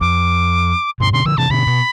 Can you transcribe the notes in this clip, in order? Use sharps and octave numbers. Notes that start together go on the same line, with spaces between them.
F2 D6
G2 B2 C6
B2 D3 C6
D3 F3 E6
C3 E3 A5
B2 D3 B5
B2